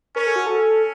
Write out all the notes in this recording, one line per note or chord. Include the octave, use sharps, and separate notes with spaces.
C#4 A#4
A4
F#4
C#4 A4